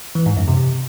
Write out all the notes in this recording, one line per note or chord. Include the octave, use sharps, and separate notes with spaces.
E3
G#2
F#2
C3